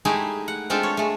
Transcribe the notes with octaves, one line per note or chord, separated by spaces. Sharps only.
G#3 A3 D#4 E4 G4 G#4
F#5
G#3 C4 D4 F4 G4 A4
C#5
G#3 A3